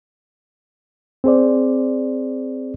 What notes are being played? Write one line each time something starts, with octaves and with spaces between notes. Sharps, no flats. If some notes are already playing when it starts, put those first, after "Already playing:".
C4 G#4 C5 D5